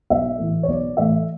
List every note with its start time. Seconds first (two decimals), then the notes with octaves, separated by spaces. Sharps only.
0.10 B1 E5
0.38 A2 E3 A3
0.63 C#5
0.68 B1 D5
0.97 A2 E3 A3 E5